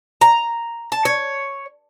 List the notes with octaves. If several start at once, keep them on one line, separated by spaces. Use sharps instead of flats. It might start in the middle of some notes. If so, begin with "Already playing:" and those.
A#5
A5
C#5